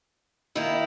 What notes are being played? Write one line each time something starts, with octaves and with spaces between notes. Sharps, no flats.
D#3 A#3 E4